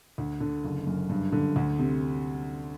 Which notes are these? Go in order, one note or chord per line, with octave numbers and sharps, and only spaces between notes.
D2
D3
F#1
F#2
G2
D3
D2
C3